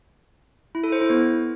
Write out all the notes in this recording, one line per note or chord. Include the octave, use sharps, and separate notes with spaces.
E4
A4
C5
E4
B3